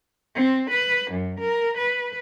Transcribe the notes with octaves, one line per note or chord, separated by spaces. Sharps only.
C4
B4
F#2
A#4
B4